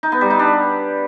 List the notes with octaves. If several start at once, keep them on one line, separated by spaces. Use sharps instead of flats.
D#4
B3
G3
D#4
D4